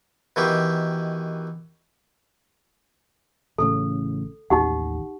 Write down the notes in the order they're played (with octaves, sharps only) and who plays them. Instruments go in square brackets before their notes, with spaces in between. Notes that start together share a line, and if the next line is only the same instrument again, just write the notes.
[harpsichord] B2 D#3 E3 G4
[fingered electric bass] A1 A2 C#3 [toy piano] A4
[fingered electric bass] A1 D#2 [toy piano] D#4 G4 F#5